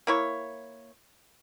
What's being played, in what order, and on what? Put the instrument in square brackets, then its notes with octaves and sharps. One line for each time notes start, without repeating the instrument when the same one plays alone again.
[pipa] A#3 E4 C#5